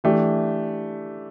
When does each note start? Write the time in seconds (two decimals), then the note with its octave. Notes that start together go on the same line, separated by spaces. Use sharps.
0.04 E3 A3 D4 G4